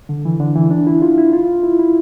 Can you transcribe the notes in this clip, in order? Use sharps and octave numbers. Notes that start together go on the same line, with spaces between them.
D3
E3
D3
E3
D4
E4
F4
E4
F4
E4
E4